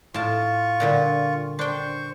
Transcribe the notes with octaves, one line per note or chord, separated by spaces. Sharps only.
A2 F4 A5 C#6
A#2 D3 G3
D4 C5 G5 C#6